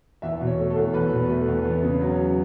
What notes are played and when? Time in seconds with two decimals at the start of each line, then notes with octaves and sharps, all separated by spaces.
0.22 E2 E5
0.41 B2
0.47 C#5
0.58 A3
0.70 A4
0.76 E2
0.94 E2 B4
1.11 B2
1.29 A3
1.48 E2
1.65 B3
1.83 C#3
2.01 F#3